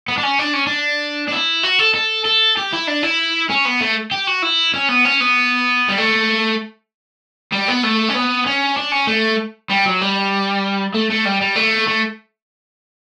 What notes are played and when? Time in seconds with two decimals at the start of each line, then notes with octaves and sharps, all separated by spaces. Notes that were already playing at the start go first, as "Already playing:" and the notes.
0.08 B3
0.18 D4
0.23 C#4
0.39 D4
0.53 C#4
0.67 D4
1.28 D4
1.32 E4
1.63 F#4
1.79 A4
1.94 A4
2.25 A4
2.57 G4
2.73 E4
2.87 D4
3.03 E4
3.50 C#4
3.65 B3
3.81 A3
4.11 G4
4.27 F#4
4.42 E4
4.74 C#4
4.89 B3
5.05 C#4
5.20 B3
5.88 G3
5.98 A3
7.53 G3
7.68 B3
7.83 A3
8.09 C#4
8.14 B3
8.46 C#4
8.76 D4
8.92 C#4
9.07 A3
9.70 G3
9.85 F#3
10.01 G3
10.94 A3
11.10 A3
11.25 G3
11.41 G3
11.56 A3
11.87 A3